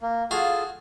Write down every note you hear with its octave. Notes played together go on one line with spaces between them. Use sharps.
A#3
F4 F#4 G#4 A4 F5